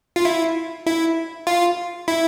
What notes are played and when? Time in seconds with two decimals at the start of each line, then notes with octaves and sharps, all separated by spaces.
0.16 F4
0.25 E4
0.87 E4
1.47 F4
2.08 E4